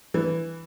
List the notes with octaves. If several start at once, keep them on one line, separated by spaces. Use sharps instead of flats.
E3